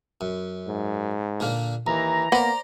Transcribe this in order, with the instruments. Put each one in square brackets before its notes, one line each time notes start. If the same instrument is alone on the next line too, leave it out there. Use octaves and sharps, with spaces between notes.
[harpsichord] F#2
[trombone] G#2
[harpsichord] A#2 D3 A#3
[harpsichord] D#2 [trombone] E3 [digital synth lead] A#5
[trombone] A#3 [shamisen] B3 [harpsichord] C5 D5